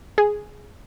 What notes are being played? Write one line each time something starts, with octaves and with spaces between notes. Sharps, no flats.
G#4